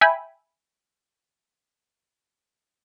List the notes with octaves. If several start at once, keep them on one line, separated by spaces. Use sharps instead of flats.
E5 G5 G#5 B5